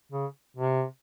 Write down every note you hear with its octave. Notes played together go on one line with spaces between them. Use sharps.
C#3
C3